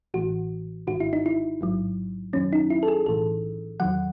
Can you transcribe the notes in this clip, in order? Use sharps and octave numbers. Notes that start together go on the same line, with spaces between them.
A1 A2 E3 F#4
G#1 G#2 D#3 F#4
E4
D#4
E4
A1 G#2 F#3
F#2 D#3 F#3 C#4
D#4
E4
A4
G#4
B1 A2 E3 A4
E2 D#3 F#3 F#5